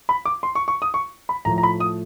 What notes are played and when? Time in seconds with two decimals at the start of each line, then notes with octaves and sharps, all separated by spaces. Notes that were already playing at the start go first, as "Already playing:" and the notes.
0.09 B5
0.25 D6
0.43 C6
0.55 C#6
0.68 C#6
0.82 D#6
0.94 C#6
1.29 B5
1.45 A2 F3 A3 A#5
1.58 A#5
1.63 B5
1.80 D#6